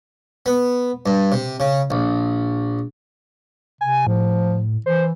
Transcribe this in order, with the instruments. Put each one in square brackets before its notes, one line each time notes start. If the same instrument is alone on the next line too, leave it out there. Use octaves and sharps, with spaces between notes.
[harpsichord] B3
G2
C3
C#3
A#1
[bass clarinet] C3 [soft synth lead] G#5
[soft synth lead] A2 [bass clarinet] F3
[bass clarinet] E3 [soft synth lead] C5